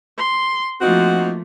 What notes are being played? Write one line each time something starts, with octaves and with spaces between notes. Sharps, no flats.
C6
F3 A3 A#3 C4 D#4 F4 F#4